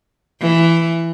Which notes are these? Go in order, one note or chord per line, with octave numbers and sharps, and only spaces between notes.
E3